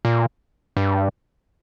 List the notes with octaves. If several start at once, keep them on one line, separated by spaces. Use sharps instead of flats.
A#2
G2